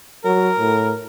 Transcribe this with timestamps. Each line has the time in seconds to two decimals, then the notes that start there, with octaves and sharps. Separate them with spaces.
0.25 F#3 A#4
0.59 A2